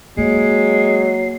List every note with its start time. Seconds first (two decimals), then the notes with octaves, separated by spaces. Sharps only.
0.17 F#3 G#3 A#3 C7